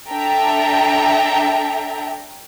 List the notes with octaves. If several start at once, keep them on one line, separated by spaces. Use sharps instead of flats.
D4 A4 E5 G5 A#5